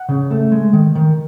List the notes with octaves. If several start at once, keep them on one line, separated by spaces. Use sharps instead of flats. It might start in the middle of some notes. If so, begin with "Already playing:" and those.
Already playing: F#5
C#3
A3
G#3
D#3
D#3